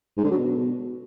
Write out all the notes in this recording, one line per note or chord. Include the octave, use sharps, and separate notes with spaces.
G#2
D3
F#3
B2